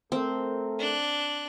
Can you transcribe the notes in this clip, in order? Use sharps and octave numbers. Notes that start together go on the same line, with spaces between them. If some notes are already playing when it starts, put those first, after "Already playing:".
A3 C4 A4 A#4
D4 F#6